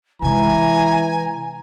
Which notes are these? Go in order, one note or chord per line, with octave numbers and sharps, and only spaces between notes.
C3 E3 G#3 G#5 A#5